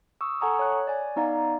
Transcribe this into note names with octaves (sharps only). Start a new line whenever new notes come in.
C#6 D#6 E6
A4 F#5 G#5 A#5 C#6 D#6
C#5 F#6
D5 G#5
B3 D#4 D5 F5 A#5